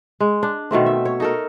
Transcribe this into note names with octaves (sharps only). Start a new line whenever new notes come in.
G#3
D4
B2 D#3 A3 C4
E5
C#5
D#4 A4 A#4